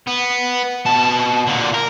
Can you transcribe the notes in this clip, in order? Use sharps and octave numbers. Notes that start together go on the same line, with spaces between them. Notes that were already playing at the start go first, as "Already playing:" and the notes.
B3
B2 A5
A#2 D3
A#4